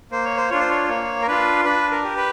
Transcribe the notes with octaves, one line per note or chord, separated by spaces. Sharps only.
A#3 C5
C#5
C5
D4 F4 C#5
C5
C#5
A#3 C#5
A#4
D4 F4 B4
D4 B4
A#4
G4
B4